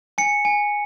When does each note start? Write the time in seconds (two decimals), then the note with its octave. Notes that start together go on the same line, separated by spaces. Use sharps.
0.18 G#5 C#7
0.45 G#5